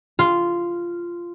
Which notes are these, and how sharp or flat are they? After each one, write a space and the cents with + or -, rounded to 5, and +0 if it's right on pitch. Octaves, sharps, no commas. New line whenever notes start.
F4 -10